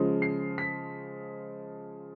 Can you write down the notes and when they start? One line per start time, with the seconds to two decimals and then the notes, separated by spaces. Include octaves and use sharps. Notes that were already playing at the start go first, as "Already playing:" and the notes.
Already playing: C#3 F3 G#3
0.22 C7
0.58 B6